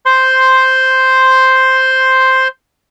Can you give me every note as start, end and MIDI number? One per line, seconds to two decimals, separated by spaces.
0.06 2.48 72
0.06 2.48 84